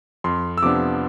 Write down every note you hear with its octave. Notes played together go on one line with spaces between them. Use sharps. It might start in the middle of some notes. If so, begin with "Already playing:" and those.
F2 C6
E6
C3 F3 B3 D4 D6